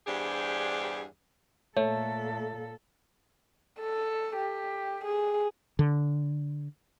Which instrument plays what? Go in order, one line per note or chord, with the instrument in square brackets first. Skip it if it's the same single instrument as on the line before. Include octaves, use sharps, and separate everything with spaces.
[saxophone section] E2 G2 D4 G4 G#4 C5
[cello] A#2 A4 [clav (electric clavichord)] A3 [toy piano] C#5
[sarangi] A4
G4
G#4
[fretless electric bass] D3